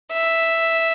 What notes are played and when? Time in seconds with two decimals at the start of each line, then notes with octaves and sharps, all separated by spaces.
0.13 E5